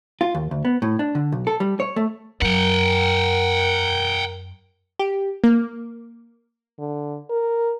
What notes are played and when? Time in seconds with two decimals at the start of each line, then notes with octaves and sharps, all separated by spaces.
0.21 F4
0.34 D#2
0.51 D2
0.65 B3
0.82 A2
0.99 D4
1.15 D3
1.32 B1
1.47 A4
1.60 G3
1.80 C#5
1.96 A3
2.42 F#2 A#4 F#5 G5
4.99 G4
5.44 A#3
6.79 D3
7.30 A#4